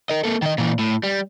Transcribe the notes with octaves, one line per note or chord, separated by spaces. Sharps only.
A#4 D#5
A#3 A4
D#3 D#5
A#2 E3
A2
G3